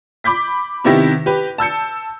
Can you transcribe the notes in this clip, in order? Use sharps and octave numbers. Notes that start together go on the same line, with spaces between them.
B5 D6 G6 B6
C3 D#3 B3 E4 G4 A#6
G4 B4
A5 E6 G6 C#7